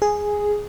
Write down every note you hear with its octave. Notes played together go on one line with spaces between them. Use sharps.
G#4